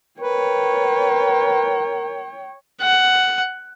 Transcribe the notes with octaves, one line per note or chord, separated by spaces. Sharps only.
A#4 B4 C#5 G5
F#5